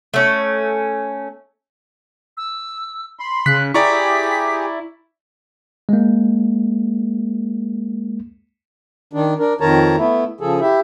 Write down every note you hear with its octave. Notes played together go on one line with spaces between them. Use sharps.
A3 C#4
E6
B5 C6
C#3 F#6 B6
E4 G4 G#4 D5 A#5 C#6 B6
G#3 A#3
D#3 D4
D4 A#4
F2 D#3 A#4 C#5 A5 A#5
A3 B3 E4
C#3 F3 G#4 A4
E4 G4 E5